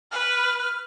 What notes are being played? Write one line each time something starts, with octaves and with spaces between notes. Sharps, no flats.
B4 F6